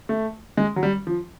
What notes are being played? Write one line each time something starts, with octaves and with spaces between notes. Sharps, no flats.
A3
G#3
F#3
G3
F3